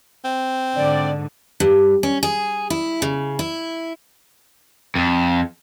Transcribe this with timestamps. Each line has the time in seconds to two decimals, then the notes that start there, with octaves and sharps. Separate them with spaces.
0.25 C4
0.77 G#2 D3 D5
1.60 G2
2.03 C#4
2.23 G#4
2.70 E4
3.02 C#3
3.39 E4
4.95 F2